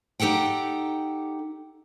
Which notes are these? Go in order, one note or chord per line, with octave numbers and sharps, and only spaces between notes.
D#4 G4 A4 F#5 G5